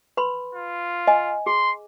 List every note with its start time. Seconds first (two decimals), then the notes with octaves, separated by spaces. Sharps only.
0.17 B4 B5 C6
0.55 F4
1.07 D#5 G#5
1.46 G#4 C6